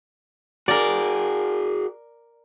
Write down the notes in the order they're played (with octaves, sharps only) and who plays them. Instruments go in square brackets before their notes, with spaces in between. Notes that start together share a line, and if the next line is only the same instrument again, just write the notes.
[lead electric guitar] F#4 G#4 [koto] A#4 D5